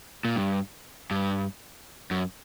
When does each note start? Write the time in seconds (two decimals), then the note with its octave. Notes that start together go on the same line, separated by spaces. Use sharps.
0.25 A#2
0.36 G2
1.11 G2
2.11 F#2